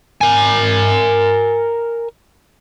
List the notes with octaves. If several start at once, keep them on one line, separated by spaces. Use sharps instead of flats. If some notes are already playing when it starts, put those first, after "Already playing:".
A#4 G#5